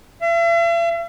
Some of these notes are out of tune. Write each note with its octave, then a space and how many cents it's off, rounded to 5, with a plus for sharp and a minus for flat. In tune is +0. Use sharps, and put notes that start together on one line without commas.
E5 +45